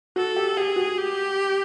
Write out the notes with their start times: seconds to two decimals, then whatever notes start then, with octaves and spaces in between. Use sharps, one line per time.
0.16 F#4 A4
0.36 G4
0.57 G4 G#4
0.76 F#4
0.98 G4